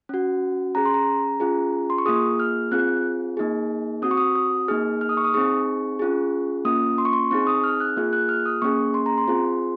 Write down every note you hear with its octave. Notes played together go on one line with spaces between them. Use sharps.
C#4 F#4
C#4 G#4 A#5
C6
A#5
C#4 F4 G#4
C6
C#6
A#3 F4 G#4 D#6
F6
C4 F4 G#4 F#6
A#3 D#4 G#4
C4 F#4 D#6
C#6
D#6
D#6
A#3 D#4 G#4 F6
F6
D#6
C#6
D#6
C4 D#4 G#4 C#6
C#4 F4 G#4
A#3 C#4 F4 D#6
C6
C#6
C6
C4 D#4 G#4 C#6
D#6
F6
F#6
A#3 F4 G#4
F#6
F6
D#6
A#3 C#4 G#4 C#6
C6
A#5
C6
C4 F4 G#4